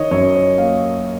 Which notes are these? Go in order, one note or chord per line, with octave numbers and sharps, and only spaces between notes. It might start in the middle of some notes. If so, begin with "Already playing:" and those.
Already playing: D#3 C#5 D#5
F#2 C#5
C#5
A#3 F5